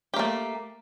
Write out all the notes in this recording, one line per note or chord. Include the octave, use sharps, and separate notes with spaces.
A3 A#3 G4